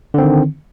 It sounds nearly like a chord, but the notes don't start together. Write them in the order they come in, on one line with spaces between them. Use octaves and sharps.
D3 C4 D#3